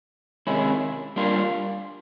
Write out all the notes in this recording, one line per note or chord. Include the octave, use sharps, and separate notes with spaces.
C3 D#3 G#3 C#4 E4
G3 A#3 D4 F4